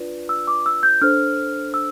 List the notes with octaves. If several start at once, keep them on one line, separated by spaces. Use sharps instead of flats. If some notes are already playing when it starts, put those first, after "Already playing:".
Already playing: D4 F4 B4 D5
E6
D6
E6
G6
D4 A4 C5 F6
E6